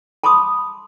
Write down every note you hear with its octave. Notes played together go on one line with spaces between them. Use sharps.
A5 B5 C6 D6 D#6